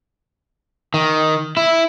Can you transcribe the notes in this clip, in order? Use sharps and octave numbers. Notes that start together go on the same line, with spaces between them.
D#3
E4